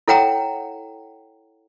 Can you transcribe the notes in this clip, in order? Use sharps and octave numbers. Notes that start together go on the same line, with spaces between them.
E4 A4 C#5 F#5 G5 A#5